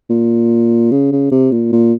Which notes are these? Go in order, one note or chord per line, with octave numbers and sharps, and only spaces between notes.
A#2
C#3
C#3
C3
A#2
A#2